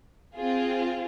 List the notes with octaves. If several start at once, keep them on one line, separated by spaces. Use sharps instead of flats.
C4 F4 G#4